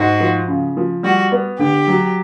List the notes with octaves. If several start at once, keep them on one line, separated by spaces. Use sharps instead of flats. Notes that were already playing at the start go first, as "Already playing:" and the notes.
Already playing: G#2 F#4
F3
C#3
F3
G3 F#4
B3
D3 G4
F#3